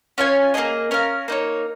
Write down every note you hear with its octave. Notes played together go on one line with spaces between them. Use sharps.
C#4 F4 C#5 G#5
A#3 D#4 G#4 D#5
C#4 A#4 F5
A#3 D#4 C#5